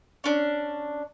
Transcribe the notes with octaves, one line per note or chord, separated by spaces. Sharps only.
C#4 D4